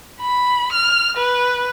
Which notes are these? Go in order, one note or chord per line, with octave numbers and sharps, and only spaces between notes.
B5
F6
B4